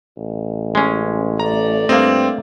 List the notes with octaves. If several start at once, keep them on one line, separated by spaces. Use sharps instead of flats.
A1
G#3 C#4
A3 D5 A#5
G2 A#3 C4 D#5